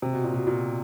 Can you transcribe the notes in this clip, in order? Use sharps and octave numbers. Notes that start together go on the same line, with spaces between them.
C3
B2
A#2
B2
A#2